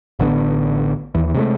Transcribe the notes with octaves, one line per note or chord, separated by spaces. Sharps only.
A1 D3 F3 B3
D#2 E3
C3 G#3 A3